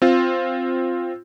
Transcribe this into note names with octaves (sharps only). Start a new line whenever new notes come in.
C4 F4